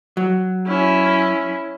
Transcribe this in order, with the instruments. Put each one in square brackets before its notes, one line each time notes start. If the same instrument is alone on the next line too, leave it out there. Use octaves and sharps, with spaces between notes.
[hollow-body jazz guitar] F#3
[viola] C#4 E4